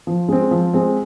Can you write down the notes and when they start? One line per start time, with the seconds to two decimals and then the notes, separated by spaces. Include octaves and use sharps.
0.07 F3
0.29 G#3 C4
0.51 F3
0.73 G#3 C4